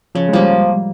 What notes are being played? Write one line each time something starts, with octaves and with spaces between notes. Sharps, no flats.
C#3 F3
G#3
F3 G3 A#3